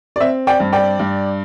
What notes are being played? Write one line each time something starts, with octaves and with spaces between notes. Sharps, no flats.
D5
C4 E5
D5 G5
G2
D5 G5
G2